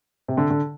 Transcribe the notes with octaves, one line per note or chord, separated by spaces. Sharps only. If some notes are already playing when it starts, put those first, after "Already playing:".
C3
D3
D3